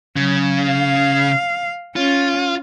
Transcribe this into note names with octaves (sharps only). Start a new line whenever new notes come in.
C#3 F#3
F5
C#4 F4